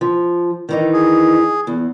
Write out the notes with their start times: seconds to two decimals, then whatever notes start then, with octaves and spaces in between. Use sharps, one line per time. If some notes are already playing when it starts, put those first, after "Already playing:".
0.01 F3
0.69 D#3 E3 D#4
0.93 G#4
1.67 E2